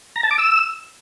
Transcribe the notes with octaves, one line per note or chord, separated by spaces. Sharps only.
A#5
A5
D6
E6